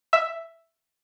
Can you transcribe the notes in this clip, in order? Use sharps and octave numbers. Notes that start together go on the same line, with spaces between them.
E5